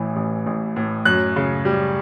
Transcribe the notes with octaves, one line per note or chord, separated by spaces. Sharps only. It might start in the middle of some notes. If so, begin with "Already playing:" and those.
Already playing: A1 A2 E3
A1
A1
A2
F#2 F#6
C#3
G3